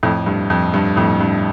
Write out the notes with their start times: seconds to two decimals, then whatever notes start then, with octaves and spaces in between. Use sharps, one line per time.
0.03 F2 A2
0.26 G2
0.50 F2
0.74 G2
0.96 F2 A2
1.20 G2